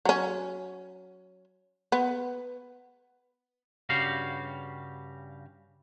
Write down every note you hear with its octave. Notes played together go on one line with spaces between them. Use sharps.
F#3 C#4
B3
G2 C#3 G3 F#4 G4 F5